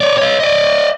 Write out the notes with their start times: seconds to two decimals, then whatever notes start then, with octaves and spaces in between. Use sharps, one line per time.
0.01 C#5 D5
0.18 C#5 D#5
0.40 D5 D#5